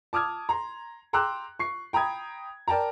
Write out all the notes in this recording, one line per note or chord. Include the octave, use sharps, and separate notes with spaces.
A5 D6 D#6 F6 G#6
A#5 C6
G5 A#5 C6 D6 E6 F#6
C#6 C7
G5 A#5 B5 D#6 G#6
A#4 D5 G5 A5 A#5